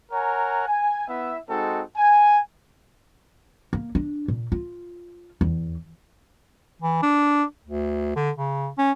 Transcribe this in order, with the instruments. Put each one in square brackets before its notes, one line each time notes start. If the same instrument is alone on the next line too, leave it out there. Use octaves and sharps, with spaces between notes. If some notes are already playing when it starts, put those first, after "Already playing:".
[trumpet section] A#4 C#5 F#5 G#5 A#5
G#5
B3 E4 E5
G#3 C4 D#4 F#4 A4
G#5
[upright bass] A#3
D4
A#2
F4
E2
[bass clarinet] E3
D4
D2
D3
C#3
C#4